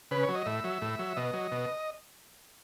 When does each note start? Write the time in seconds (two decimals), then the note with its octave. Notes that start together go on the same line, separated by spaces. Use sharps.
0.11 C#3 B4
0.23 C#5
0.29 F#3
0.35 D#5
0.45 A2 E5
0.64 F#3
0.81 A2
0.99 F#3
1.17 B2 D#5
1.33 F#3
1.52 B2